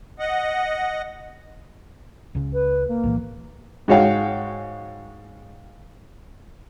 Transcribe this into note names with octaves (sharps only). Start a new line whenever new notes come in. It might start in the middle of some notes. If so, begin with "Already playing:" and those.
D#5 F#5
C#2 C#3
B4
A#3
B1 A2 E3
G#2 G#3 F#4 C#5 F5 G5